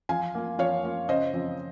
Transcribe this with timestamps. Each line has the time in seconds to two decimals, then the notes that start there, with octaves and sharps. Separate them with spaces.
0.09 F3 F5 G#5
0.35 A#3 F4
0.58 F3 C#5 F5
0.84 A#3 F4
1.09 C#3 C5 D#5
1.34 F3 C4